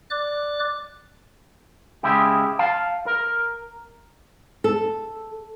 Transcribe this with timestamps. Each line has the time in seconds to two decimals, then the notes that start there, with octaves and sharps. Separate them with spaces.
0.10 D5 D6 F#6
2.03 C#3 G#3 E4 G4
2.59 F5 A5
3.06 A#4
4.64 A4